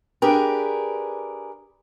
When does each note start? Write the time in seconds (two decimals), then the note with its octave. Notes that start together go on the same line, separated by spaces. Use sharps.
0.22 D4 G4 G#4 A#4 B4